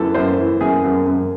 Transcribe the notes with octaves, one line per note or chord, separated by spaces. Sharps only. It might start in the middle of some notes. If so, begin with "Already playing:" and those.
Already playing: F#2 E3 A4
F#2 C5
E3
F#2 G#4
F#2
F#2